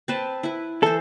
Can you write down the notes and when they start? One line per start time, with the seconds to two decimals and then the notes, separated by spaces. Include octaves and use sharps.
0.08 C4 B4 A5
0.43 E4 B4
0.83 E3 A4 C5